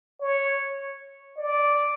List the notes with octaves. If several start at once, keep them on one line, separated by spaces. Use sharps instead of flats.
C#5
D5